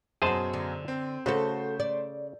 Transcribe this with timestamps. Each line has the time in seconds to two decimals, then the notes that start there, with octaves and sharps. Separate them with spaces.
0.22 F#2 B2 F#3 G#4 C5 A5
0.53 D3
0.88 C4
1.26 C#3 A3 F#4 A4 C5
1.80 D5